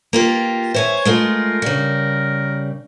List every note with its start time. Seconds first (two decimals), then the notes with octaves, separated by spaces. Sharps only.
0.13 A#3 F4 G4
0.74 C5 C#5 E5 G#5
1.05 G#3 A3 F4 A#4
1.62 C#3 G3